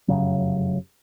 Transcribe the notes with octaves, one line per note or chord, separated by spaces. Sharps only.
F1 F#2 C#3 F#3